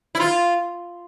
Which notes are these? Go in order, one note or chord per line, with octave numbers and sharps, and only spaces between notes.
E4
F4